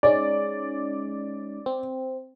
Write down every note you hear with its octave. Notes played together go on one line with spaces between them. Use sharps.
G#3 C#4 D#4 D5
C4